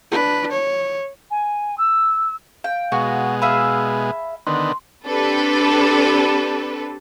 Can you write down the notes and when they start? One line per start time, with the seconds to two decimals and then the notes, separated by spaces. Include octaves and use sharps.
0.11 D4 B4
0.51 C#5
1.31 G#5
1.78 E6
2.64 F5 G5
2.92 B2 G#3 F#4
3.42 G#4 E5 F5 B5
4.47 D3 D#3 B3 C6
5.06 C4 D4 G4 A4 B4